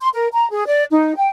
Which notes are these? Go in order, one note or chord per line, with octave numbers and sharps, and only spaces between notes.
C6
A#4
A#5
G#4
D5
D#4
G5